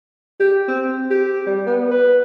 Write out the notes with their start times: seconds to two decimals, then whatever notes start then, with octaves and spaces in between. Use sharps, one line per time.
0.40 G4
0.68 C4
1.10 G4
1.47 G3
1.66 B3
1.91 B4